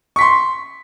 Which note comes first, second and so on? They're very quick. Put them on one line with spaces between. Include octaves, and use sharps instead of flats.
C#6 B6 C6